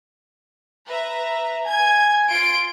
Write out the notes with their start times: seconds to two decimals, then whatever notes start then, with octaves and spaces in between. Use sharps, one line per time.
0.88 B4 E5 A#5
1.64 G#5 G#6
2.29 F4 C6 D7